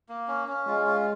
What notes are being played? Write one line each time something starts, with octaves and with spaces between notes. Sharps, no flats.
A#3
C#4
C#4
G#3 F4
F4